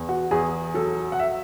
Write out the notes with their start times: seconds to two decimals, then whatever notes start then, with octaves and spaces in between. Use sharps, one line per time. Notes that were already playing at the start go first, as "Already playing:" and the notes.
Already playing: E2
0.09 F#4
0.31 E2 G#4
0.74 F#3 A4
1.12 F#5
1.20 E5